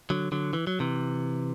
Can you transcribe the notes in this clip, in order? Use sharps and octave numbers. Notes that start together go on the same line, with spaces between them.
D3 F#3
D3 F#3
E3
F#3
C3 E3